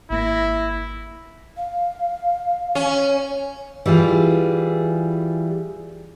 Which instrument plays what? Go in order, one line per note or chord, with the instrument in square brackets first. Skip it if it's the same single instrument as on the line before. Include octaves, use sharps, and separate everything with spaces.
[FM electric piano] G#1 A#3 A#6 [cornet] E4
[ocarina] F5
[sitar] C#4
[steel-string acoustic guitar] E3 G3 F4 G#4